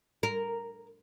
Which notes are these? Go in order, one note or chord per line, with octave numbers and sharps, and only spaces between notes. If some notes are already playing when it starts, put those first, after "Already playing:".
A#4